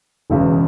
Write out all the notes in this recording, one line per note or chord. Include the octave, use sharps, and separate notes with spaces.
E1 E2 C#3